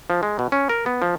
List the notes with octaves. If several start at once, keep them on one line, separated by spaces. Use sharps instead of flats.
F3
G#3
B2
C#4
A#4
B3
F3